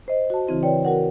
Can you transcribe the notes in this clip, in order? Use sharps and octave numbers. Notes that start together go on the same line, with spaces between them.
C5 D#5
F#4 A5
C#3 E3 C4 E4
B4 C#5 D5 G5
F#4 A#4 F#5